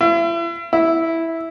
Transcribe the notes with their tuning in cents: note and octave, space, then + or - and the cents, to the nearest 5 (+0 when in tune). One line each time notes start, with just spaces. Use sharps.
E4 +40
E4 -5